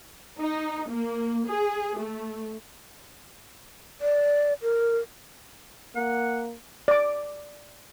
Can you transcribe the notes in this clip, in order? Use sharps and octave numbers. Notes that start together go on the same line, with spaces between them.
D#4
A#3
G#4
A3
D5
A#4
A#3 F#5
D5 D6